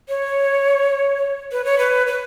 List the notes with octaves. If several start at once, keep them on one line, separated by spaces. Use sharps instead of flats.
C#5
B4
C#5
B4
B4